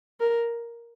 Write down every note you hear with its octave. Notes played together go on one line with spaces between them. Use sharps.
A#4